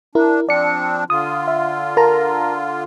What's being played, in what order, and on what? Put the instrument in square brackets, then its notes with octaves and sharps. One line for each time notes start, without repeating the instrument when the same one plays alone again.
[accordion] D4 [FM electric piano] E4 A#4
[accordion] F3 C4 D4 [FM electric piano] D5 C#7
[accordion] D3 F4 [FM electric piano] D#6
[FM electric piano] E5
A#4 A5 A#5